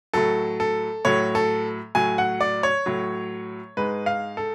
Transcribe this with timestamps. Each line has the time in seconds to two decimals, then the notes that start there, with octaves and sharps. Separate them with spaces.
0.13 A2 F#3 A4
0.60 A4
1.05 A2 F#3 C#5
1.35 A4
1.95 A2 F#3 G#5
2.18 F#5
2.41 D5
2.63 C#5
2.86 A2 F#3
3.77 G#2 G#3 B4
4.06 F5
4.37 A4